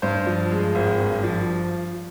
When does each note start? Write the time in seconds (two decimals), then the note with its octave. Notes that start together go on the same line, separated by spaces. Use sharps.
0.02 G2 C5
0.27 F3
0.51 G#3
0.75 G#1
1.00 G2
1.23 F3